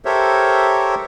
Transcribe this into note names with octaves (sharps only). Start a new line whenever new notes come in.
G4 A4 A#4 C5 C#5 E5